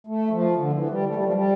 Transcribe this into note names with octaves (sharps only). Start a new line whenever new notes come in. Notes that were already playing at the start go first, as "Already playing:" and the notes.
A3
F3
D3
E3
G3
A3
G3
F3
G3